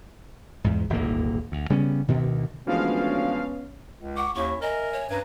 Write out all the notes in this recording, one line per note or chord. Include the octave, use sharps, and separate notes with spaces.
E2 G#2
D#1 G#1 D2 A#3
D2
C#3 G3 B3 C#4
D2 B2 D#3
D2 E3 F3 G#3 B3 C#4 F5
C#2
F#5 C#6 D6
D#2 C#4 E4 C#5 C#6
A#4 D#5 E5 G#5
C#5
G2 C#4 B4 A#5 G#6